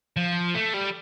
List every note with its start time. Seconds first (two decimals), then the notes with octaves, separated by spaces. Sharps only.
0.17 F3
0.55 A3
0.74 G3